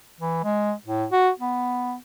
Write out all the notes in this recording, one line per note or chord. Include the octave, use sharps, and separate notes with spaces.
E3
G#3
A2
F#4
B3